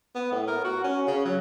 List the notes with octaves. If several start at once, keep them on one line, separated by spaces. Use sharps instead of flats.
B3
A2
A#4
F#4
C#4
C#3
F#3